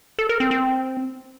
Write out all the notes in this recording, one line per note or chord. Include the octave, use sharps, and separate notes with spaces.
A4
A#4
C4
C4